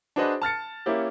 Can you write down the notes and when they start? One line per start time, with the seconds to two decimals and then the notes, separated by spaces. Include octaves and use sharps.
0.16 D4 F#4 G#4 B4 C5 D#5
0.42 A5 F6 A6 C#7
0.86 A#3 C#4 E4 G4